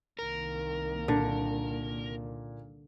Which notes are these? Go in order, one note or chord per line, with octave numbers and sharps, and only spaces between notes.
C2 D#3 A#3 A#4
A#2 D3